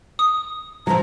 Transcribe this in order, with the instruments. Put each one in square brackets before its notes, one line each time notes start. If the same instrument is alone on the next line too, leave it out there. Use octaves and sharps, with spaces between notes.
[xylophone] D#6
[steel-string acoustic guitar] F3 F#3 [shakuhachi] A#5